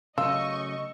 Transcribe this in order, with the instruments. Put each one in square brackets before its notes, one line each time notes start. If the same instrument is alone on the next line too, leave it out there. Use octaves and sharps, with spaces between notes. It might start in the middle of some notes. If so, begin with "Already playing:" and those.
[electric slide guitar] C#3 F#3 A3 [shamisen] F4 [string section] D#5 C#6 [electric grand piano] E6